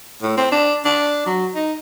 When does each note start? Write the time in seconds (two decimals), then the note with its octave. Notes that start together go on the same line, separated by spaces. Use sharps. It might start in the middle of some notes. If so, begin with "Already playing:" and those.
0.22 A2
0.37 C4
0.52 D4
0.85 D4
1.26 F#3
1.55 D#4